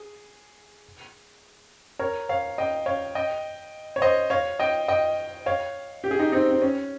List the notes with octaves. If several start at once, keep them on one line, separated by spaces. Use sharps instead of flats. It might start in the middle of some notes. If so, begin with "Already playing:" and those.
Already playing: G#4
A#4 C#5
C#5 F5
D#5 G5
C#5 F5
D#5 G5
C#5
C5 D#5
C#5 F5
D#5 G5
D#5 G5
C#5 F5
G4
G#4
D#4 G4
C4 D#4
C4
C#4